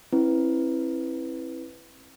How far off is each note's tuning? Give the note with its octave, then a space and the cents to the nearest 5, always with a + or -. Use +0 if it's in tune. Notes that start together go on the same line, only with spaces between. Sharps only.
C4 +40 E4 +0 B4 +0